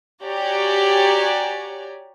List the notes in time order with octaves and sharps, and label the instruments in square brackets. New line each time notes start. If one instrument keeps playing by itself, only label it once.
[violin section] F#4 G4 C#5 D5 G#5 A#5